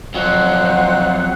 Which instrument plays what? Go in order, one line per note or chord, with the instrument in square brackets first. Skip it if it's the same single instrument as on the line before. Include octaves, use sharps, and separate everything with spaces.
[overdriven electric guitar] F2 F#3 [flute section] C5 F#5 F#6